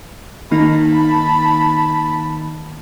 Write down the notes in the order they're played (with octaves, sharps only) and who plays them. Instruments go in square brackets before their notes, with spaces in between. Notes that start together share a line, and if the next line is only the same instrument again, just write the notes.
[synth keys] D#3 A#3 D#4 [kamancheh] A5 B5